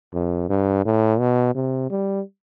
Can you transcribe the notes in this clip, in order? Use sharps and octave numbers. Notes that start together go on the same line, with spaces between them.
F2
G2
A2
B2
C3
G3